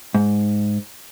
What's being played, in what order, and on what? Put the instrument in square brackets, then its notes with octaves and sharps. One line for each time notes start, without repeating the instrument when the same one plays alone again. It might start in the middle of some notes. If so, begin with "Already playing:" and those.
[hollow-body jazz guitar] G#2